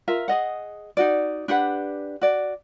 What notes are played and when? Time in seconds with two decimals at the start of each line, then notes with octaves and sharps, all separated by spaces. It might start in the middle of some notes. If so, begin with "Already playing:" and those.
0.08 F4 A#4 E5
0.28 G#4 D#5 F#5
0.97 D#4 F#4 D5
1.48 D4 G4 B4 F#5
2.21 F#4 D5